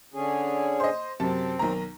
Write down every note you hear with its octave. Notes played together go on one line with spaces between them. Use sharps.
D3 C#4 G#4
C5 D#5
F#2 C3 C4 A5
B1 D#3 A#5